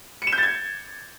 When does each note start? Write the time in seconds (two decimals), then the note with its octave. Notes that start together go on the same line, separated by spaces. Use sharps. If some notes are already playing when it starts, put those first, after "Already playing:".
0.22 C#7
0.27 E7
0.32 G6
0.38 A6
0.43 G#6